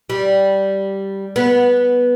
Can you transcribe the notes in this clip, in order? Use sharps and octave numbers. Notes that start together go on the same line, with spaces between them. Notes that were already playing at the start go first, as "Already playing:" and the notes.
G3
B3